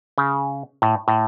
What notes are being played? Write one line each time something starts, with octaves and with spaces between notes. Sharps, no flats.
C#3
A2
A2